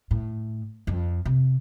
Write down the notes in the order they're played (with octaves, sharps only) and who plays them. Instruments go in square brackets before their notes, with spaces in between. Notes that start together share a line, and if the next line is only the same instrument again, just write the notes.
[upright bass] A2
F2
C3